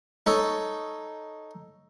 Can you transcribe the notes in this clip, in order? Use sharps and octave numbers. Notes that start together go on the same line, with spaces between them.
D#4 A4 C#5